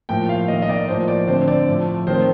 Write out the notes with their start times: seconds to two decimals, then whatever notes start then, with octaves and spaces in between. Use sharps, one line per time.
0.09 A2 F3 A#3 G5
0.29 F5
0.48 D#3 A#3 D#5
0.62 D#5
0.69 D5
0.88 A2 F3 A#3 C5
1.08 D5
1.27 D3 A3 C4 C5
1.48 D5
1.68 A2 F3 A3
2.07 D#3 A3 C4 C5